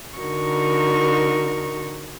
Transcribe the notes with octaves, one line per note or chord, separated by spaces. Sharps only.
D3 D#4 F#4 A#4 C#6